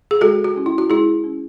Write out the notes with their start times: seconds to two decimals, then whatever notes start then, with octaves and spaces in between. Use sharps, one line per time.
0.11 G#4
0.21 G#3 F#4 A4
0.44 F#4
0.56 C#4 E4
0.66 E4
0.78 F#4
0.90 G#3 E4 G#4
1.24 C#4 E4